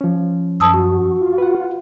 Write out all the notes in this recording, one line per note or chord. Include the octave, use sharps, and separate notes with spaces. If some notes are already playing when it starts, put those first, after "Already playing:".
F3 C#4
F#2 A5 D#6 E6
F#4
F4
B4 F#5